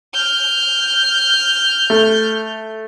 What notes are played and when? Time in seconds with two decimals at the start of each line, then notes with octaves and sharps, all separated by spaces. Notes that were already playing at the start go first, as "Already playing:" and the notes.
0.14 F6 G6
1.90 A3